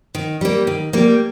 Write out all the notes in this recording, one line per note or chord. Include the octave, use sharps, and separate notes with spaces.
D#3
G3 A#3
D#3
G3 A#3